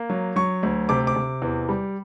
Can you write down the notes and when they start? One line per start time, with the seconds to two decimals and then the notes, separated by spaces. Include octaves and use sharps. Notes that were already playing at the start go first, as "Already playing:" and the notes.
Already playing: A#3
0.10 F#3
0.36 F#3 C#6
0.63 D2
0.89 C3 D6
1.07 D6
1.16 C3
1.42 E2
1.69 G3